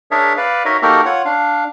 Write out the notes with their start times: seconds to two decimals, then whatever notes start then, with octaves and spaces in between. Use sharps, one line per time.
0.11 D4 G#4 A#4 C#5 E5 A5
0.37 B4 D5 F5
0.65 D#4 F#4 A#4 C#5 D#5 E5
0.82 A#3 D#4 F#4 G4 A4 A#4
1.06 F4 C#5 F#5
1.25 D4 F5